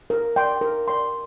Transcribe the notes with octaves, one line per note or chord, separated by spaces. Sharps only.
A#4
D5 G5 C6
A#4
D5 G5 C6